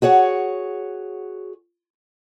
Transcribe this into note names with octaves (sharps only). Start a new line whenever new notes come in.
F#4 G#4 C#5 F#5